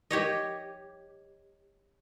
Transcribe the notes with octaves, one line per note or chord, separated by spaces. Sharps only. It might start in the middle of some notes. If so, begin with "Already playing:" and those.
G4 C#5 D#5